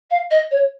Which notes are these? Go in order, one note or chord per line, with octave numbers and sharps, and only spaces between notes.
F5
D#5
C#5